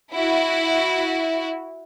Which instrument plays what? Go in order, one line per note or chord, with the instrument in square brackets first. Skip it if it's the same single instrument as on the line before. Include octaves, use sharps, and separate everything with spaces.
[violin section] E4 F#4